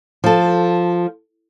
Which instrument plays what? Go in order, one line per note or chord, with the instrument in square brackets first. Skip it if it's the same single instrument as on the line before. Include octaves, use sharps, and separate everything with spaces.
[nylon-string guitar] F3 A4